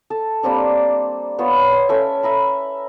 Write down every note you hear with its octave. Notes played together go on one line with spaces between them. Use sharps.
A4 A5
G3 A#3 C4 D4
B3 F4 C5 C#5
C6
C#4 A4 E5
E5 A#5 B5